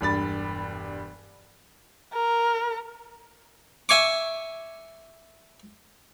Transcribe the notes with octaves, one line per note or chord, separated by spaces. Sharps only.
E1 G2 B5 A6
A#4
E5 G#5 C#6 D6